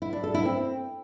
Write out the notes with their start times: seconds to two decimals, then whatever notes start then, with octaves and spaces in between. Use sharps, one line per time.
0.02 E4
0.13 D4
0.24 A4
0.34 E4
0.45 C4